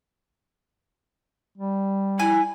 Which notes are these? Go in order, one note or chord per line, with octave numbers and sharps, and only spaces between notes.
G3
E4 G#5